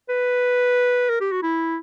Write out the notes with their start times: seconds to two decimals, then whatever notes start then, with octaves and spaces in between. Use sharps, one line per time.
0.09 B4
1.09 A#4
1.21 G4
1.32 F#4
1.42 E4